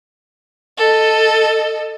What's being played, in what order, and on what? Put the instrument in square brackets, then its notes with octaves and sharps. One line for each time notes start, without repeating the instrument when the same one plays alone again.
[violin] A4 D#5